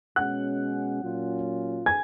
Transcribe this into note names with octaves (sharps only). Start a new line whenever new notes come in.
B2 G#3 C#4 F#5 F#6
A#2 F#3 C#4 F4
G#5 G#6